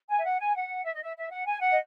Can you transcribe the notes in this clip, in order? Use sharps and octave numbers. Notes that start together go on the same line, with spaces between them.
G#5
E5
F#5
G#5
F#5
E5
D#5
E5
E5
F#5
G#5
F#5
D#5